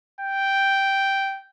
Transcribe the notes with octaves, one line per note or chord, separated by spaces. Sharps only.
G5